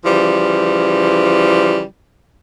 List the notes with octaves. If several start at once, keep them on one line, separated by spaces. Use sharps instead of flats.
C#3 E3 F3 G3